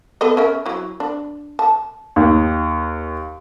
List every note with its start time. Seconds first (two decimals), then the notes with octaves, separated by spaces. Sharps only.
0.21 B3 A4 D#5
0.37 C#4 A#4 E5
0.66 F#3 E4
1.00 D4
1.59 A5
2.16 D#2